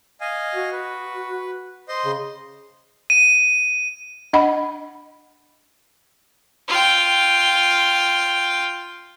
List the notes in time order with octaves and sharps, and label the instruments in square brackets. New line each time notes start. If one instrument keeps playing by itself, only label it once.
[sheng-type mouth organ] D#5 F5 G#5
[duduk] F#4
[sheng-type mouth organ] B4
C5 D#5 C6
[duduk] C#3
[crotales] D#7
[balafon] D4 D#5 F#5 B5
[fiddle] F4 G5